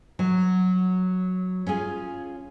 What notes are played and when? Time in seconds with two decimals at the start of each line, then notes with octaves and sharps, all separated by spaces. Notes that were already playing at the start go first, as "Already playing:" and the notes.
0.19 F#3
1.67 C#4 F4 G#4